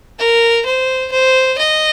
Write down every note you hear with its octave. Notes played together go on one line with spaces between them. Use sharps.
A#4
C5
C5
D#5